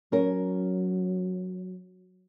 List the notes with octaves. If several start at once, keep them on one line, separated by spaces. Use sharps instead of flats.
F#3 C#4 A#4